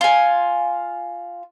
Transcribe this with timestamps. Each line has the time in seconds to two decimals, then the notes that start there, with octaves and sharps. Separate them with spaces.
0.01 F4 G#5